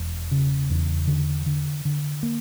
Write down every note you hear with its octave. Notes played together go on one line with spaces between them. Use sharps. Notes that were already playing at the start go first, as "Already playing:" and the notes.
Already playing: E1
C#3
E2
D3
D3
D3
A#3